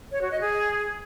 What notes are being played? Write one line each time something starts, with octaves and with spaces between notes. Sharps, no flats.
C#5
F#4
D#5
G#4